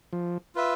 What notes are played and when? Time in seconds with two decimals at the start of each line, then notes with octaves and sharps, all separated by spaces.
0.13 F3
0.55 F4 B4 E5